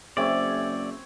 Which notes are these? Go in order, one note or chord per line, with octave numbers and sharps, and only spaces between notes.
F#1 C4 G#4 C#5 D5 E5